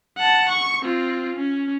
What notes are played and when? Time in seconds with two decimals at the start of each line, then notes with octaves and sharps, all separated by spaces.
0.17 F#5 A5
0.49 C#6
0.81 C4 F4
1.36 C#4